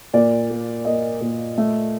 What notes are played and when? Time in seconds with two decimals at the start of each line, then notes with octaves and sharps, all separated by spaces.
0.14 A#2 D5
0.50 A#3
0.85 A#3 D#5
1.21 A#2
1.58 A3